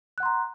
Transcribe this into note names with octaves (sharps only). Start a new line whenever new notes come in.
F#5 A#5 C6 F#6